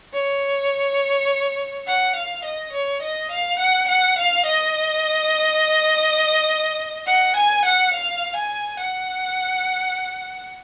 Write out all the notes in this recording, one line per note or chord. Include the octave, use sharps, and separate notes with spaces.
C#5
F#5
F5
D#5
C#5
D#5
F5
F#5
F#5
F5
D#5
F#5
G#5
F#5
F5
G#5
F#5